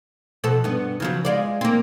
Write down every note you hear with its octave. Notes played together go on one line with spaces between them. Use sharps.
B2 F3 A4
G2 B3
C#3 F3 F#3
G#3 F4 D5
A#3 C4